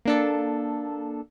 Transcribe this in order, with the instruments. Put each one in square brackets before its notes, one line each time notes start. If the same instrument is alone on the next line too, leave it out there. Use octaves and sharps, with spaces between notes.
[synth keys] A#3 D4 A4